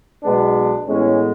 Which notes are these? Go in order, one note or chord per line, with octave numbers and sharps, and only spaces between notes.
B1 B2 G#3 B3 D4
A1 A2 G#3 B3 C#4